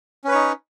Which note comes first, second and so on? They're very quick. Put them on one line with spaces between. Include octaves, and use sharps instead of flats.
C#4 B4 C#5 D#4